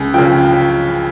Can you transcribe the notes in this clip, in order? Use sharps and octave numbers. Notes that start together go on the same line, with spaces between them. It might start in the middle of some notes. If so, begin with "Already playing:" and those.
Already playing: C#2
C#3 F3 G5